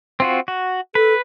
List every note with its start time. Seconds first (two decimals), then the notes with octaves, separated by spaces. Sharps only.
0.20 C4 F4 F#4
0.48 F#4
0.95 A4 B4